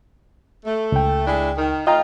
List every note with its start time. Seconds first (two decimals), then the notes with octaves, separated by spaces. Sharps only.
0.65 A3
0.92 C#2 G5
1.26 G#3 D4 E4
1.58 D#3
1.87 A2 F4 D#5 G5 A#5